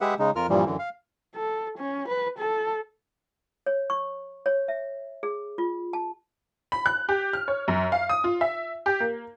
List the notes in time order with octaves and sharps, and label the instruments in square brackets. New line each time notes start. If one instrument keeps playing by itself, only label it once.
[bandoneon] G#3 G4 G#4 B4 E5 F#5
C#3 G#3 D#4
F2 F4 A#4 F6
G2 A#2 E3 F3 G3
F#2 D3 E3
F5
[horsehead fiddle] A4
C#4
B4
A4
[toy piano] C#5
C#6
C#5
E5
G#4
F4
A5
[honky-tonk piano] B5
F#6
G4
F6
C#5
F#2
F5
D#6
F4
E5
G4
A#3